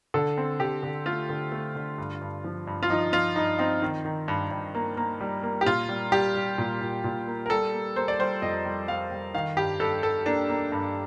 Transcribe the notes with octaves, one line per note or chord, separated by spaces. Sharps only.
D3 A4
C4
D3 G4
D3
A3 F4
D3
A3
D3
G2
G2
F3
G2
F4
F3 D#4
F3 F4
G2 D#4
C4 D#4
D#3
D#3
G2
G2
A#3
A#3
G3
A#3
G4
A#2 F4
G3
G3 G4
G3
A#2
A#2
A#2
A#3
A#4
G3 A4
A#3
A#3 C5
D5
G3 C5
F2 D#5
G3
G3 F5
G3
D#3 F5
G2 G4
G2 A4
G2 A4
A#3 D4
A#3
G2